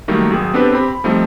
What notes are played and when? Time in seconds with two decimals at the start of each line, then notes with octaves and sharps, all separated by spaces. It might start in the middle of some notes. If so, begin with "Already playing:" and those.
0.08 D#3 F#3 G3 A3 A#3 D#4
0.30 G#1 F#3 G#4 G5
0.54 B3 C4 D4 G4 A4 B4
0.72 C4 G4 B5
0.88 B5
1.04 F3 G3 A3 C4 D#4